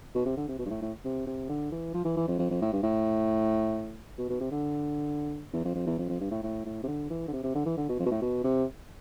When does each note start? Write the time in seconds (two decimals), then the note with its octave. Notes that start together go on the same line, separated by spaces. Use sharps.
0.15 B2
0.26 C3
0.37 D3
0.48 C3
0.59 B2
0.66 G2
0.70 A2
0.82 A2
1.05 C3
1.27 C3
1.49 D3
1.72 E3
1.94 F3
2.05 E3
2.17 E3
2.28 F2
2.39 F2
2.50 F2
2.62 A2
2.73 G2
2.83 A2
4.18 B2
4.30 B2
4.41 C3
4.51 D3
5.53 E2
5.65 F2
5.75 F2
5.87 E2
5.98 F2
6.09 F2
6.20 G2
6.31 A2
6.43 A2
6.66 A2
6.83 C3
6.88 D3
7.10 E3
7.28 D3
7.33 C3
7.43 C3
7.55 D3
7.66 E3
7.77 D3
7.89 B2
8.00 F2
8.06 B2
8.11 A2
8.22 B2
8.44 C3